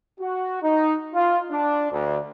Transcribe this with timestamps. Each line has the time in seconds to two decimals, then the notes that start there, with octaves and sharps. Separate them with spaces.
0.20 F#4
0.62 D#4
1.14 F4
1.51 D4
1.91 D2